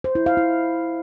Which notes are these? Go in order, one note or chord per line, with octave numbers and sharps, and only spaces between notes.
C5
E4
F5
E4